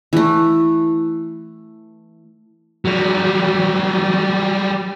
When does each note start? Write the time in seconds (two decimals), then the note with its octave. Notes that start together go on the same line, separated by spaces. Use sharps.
0.13 E3 A3
2.85 F#3 G3